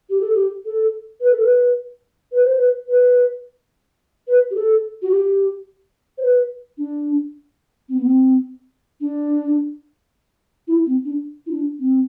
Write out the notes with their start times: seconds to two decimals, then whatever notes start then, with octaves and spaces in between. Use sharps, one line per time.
0.10 G4
0.21 A4
0.34 G4
0.65 A4
1.21 B4
1.31 A4
1.42 B4
2.32 B4
2.44 C5
2.56 B4
2.88 B4
4.28 B4
4.51 G4
4.55 A4
5.02 F#4
5.11 G4
6.18 C5
6.22 B4
6.78 D4
7.89 C4
7.97 B3
8.04 C4
9.01 D4
10.68 E4
10.86 C4
11.05 D4
11.46 E4
11.51 D4
11.79 C4